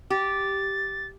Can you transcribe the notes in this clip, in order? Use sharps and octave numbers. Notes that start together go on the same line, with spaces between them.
G4 A6